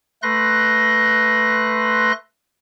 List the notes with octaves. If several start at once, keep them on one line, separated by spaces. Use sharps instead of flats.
A3 B4 C6 F#6 A#6